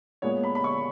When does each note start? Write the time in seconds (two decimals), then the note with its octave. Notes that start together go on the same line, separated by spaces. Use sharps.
0.22 A#2 G#3 B3 C#5
0.43 B5
0.55 B5
0.64 C#6